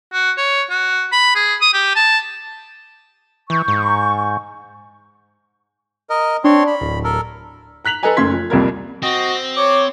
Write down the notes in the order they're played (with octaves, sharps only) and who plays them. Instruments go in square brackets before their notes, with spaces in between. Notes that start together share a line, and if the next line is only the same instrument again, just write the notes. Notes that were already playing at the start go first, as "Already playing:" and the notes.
[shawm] F#4
C#5
F#4
B5
G#4
D#6
G4
A5
[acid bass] E3 [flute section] C#6 G6
[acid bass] G#2
[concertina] A#4 D#5
[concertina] C4 C#5 C6 [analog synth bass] D4
[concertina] B5
[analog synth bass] D1
[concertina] A4 A#4
[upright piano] A#5 F#6 B6 F7 F#7
A4 B4 D#5 G#5 A#5
F#1 F#2 A3 C6 G#6 B6
F3
C2 F2 A#2 G3 A#4 G#6
[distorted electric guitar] C4 [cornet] F#4 [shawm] D#5
[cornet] C#5 [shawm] D6